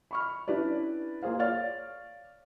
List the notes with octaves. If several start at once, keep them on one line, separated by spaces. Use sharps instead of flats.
B5 C#6 F6
C#4 D4 E4 G4 B4 D5
A#3 F4 G#4 C5 F5
C#5 D5 F5 F6 A6